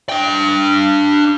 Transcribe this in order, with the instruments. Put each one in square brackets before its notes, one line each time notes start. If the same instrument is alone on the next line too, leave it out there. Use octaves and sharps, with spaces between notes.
[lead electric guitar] D4 G5